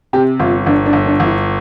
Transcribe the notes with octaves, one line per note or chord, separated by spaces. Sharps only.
C3 G4
G1 F4
G1 D4
D4
G1
D4
G1
E4